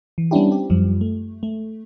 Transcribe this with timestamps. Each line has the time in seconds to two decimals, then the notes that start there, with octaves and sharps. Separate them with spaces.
0.18 E3
0.31 G3 B3 C#4 D4 E4 G4
0.48 C4 G4
0.70 F#2 F3 G3
1.01 A3
1.43 A3